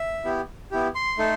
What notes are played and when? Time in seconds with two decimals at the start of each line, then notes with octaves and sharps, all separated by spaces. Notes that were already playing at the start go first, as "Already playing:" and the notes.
Already playing: E5
0.25 B3 E4 G4
0.71 B3 E4 G4
0.95 C6
1.18 A3 D#4 A4